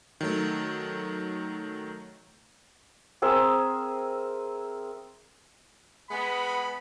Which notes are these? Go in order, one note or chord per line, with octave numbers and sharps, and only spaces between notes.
D#3 F#3 A3
C4 G#4 A#4 E5
G#3 B3 B5